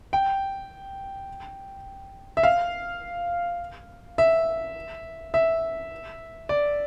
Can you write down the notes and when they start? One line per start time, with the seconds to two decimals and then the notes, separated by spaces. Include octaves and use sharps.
0.13 G5
2.37 E5
2.43 F5
4.18 E5
5.34 E5
6.49 D5